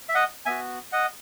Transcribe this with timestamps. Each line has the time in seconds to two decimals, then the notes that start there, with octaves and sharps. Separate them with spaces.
0.09 E5
0.15 D#5 F#5
0.46 B3 F#4 E5 G#5
0.92 D#5 F#5